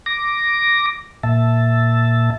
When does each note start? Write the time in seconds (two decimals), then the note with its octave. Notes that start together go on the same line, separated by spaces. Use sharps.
0.06 D6 A#6
1.23 A#2 E5 A5